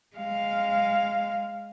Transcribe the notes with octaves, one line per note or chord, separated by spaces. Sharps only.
G#3 F5